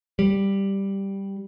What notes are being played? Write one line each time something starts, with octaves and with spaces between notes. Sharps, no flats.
G3